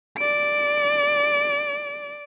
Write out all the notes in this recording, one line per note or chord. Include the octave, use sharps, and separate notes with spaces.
D5 D7